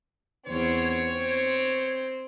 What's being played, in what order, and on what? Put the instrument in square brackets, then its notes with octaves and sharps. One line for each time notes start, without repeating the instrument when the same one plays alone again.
[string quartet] E2 C4 [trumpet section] C#5
[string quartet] C4